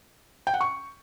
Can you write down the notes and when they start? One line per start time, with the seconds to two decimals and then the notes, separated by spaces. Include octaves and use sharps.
0.47 G5
0.54 F#5
0.61 C#6